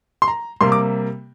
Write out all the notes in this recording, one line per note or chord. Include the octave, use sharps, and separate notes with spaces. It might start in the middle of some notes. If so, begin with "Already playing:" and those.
C6
A#5
C3 G3 A#3 C6
D6